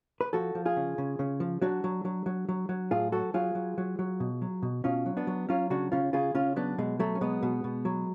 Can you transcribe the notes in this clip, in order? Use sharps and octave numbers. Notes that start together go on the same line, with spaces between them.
B4
F3 F#4 A4
F3
F4 G#4
C#3
C#3
C#3
F3
F#3 D4 F#4
F#3
F#3
F#3
F#3
F#3
A2 F4 G#4
F#3 F#4 A4
F#3 F4 G#4
F#3
F#3
F#3
B2
F#3
B2
B2 C#4 F4
F#3
B3 D4
F#3
F#3 C#4 F4
C#3 D4 F#4
C#3 C#4 F4
C#3 F4 G#4
C#3 C#4 F4
F#3 B3 D4
B2 G#3
F#3 A3
C#4
B2 G#3 B3
B2
B2
F#3